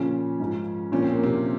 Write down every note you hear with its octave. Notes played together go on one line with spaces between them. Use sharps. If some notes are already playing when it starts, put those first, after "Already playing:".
Already playing: A#2 C#3 F3 C#4
G#2 F3
A#2 F3 C#4
C4
A#3
C3 C4